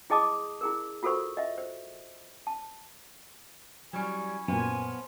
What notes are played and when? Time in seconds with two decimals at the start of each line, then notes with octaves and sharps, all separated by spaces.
0.10 E4 G#4 D#5 A5 D6 D#6
0.61 E4 G#4 A#4
1.03 F4 F#4 A4 A#4 C5 C#6
1.37 D#5 E5
1.58 C5
2.47 A5
3.93 F#3 G3 C#4 E4 C#5 G#5
4.48 F#2 A#2 F3 B3 F4 G#5